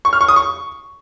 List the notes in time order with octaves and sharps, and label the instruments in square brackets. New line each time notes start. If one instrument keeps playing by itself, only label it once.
[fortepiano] C#6
F6
C#6
D#6
C#6